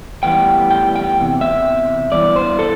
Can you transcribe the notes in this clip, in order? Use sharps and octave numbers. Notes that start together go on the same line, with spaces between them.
A2 E3 G3 B3 G5
G5
G5
E2 C3
E5
G2 E3 B3 D5
C5
A4